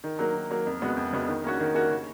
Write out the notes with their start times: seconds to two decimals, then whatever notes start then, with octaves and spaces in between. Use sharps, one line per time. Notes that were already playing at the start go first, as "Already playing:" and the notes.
0.04 D#3
0.19 F#3 A#3
0.35 D#3
0.51 F#3 A#3
0.67 F2
0.82 C#3 G#3 B3 F#4
0.97 F2
1.13 C#3 G#3 B3 F#4
1.28 D#3
1.44 A#3 C#4 F#4
1.60 D#3
1.75 A#3 C#4 F#4
1.90 C#3